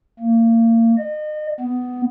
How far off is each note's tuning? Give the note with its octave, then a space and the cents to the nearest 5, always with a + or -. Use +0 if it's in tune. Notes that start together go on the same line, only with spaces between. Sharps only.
A#3 -30
D#5 -35
B3 +15